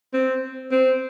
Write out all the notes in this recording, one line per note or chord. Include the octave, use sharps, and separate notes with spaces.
C4
C4